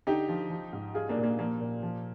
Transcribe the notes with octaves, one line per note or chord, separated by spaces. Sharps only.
D3 D#4 G4
F3
F3
G#2
G3 F4 G#4
A#3 D4
A#2
A#3
F3 A#3
A#2
F3